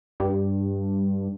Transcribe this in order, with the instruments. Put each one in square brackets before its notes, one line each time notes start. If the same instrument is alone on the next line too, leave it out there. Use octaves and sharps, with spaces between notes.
[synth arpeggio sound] G2